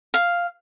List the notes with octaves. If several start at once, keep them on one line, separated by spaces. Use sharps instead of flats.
F5